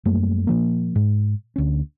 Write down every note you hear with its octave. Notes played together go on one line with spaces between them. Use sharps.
F#2 G3 A3 A#3
A#2 F3 A#3
G#2
D2 C#4